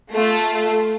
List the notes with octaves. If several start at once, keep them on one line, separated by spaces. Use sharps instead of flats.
A3 F4